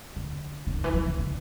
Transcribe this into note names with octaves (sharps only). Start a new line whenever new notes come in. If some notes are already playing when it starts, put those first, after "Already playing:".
D3
D3
D#3
E3
F3
C#3
D3